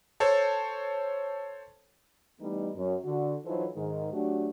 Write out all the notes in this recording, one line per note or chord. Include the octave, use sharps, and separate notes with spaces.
A4 C5 C#5 A5
E3 G3 A3 B3 D#4
F#2
D3 F#4
E3 F#3 D#4 F4 A4 C5
G#2 D#3 G#3
F#3 A3 D4 F#4 G4